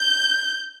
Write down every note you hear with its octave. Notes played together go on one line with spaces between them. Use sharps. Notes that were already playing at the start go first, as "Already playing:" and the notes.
Already playing: G6